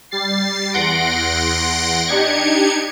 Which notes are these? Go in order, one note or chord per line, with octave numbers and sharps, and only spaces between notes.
G3 A6 C7
E2 F#5 C6 A#6 D7
D4 D#4 G4 G#6 C#7